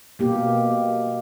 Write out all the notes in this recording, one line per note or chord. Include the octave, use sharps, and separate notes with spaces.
B2 A#3 G4